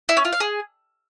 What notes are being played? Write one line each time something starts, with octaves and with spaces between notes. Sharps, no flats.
E4
C#4
F4
F5
G#4